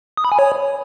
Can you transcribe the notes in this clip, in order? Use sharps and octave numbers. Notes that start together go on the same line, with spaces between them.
D#6
B5
G#5
C#5